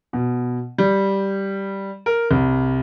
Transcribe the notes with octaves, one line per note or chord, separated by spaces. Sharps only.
B2
G3
A#4
C2